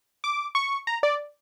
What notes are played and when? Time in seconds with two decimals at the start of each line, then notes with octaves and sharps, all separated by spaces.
0.24 D6
0.55 C#6
0.87 A#5
1.03 D5